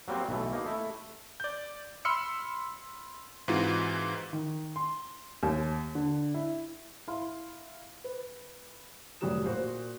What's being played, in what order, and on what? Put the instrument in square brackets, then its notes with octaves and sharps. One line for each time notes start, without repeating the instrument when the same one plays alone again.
[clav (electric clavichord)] F#3 G3 A#3 C4 C5
B1 E3 A3
A#3 D#4
A3 E4
[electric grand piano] D5 G6
B5 C6 E6 F6 C#7
G#2 E3 C4 F4 F#4
[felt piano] D#3
C6
D#2
D3
E4
E4 F5 C6
B4
F1 F#3 G3 F#4 D#6 E7
A#2 F#4 C5 F5